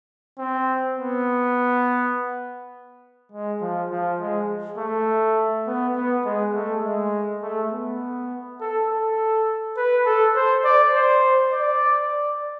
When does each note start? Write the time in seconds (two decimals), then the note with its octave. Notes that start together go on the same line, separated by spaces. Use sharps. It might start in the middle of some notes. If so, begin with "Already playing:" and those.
0.38 C4
0.98 B3
3.32 G#3
3.61 F3
3.91 F3
4.20 G#3
4.78 A3
5.67 B3
5.96 B3
6.26 G#3
6.54 A3
6.83 G#3
7.43 A3
7.73 B3
8.60 A4
8.89 A4
9.77 B4
10.06 A4
10.36 C5
10.65 D5
10.95 C5
11.53 D5
12.12 D5